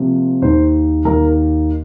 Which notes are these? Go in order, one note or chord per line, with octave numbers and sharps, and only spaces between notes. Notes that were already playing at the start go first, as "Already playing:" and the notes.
Already playing: C3 F3 A#3
D#2 D#3 A#3 D#4 C5
D#2 D#3 A#3 D#4 A#4